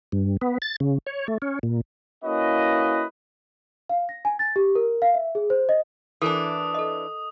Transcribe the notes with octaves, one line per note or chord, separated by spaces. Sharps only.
G2
B3
A6
C#3
C#5
A3
C#4
A#2
A#3 C#4 E4 F#4 B4 D#5
F5
A#6
G#5
A6
G4
A#4
F5
E5
G#4
C5
D#5
E3 D4 A4 A#4 G#5 D#6
A4 D#5